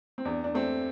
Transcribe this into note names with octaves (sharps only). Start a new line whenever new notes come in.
C4
E2 D4
D4
A3 C4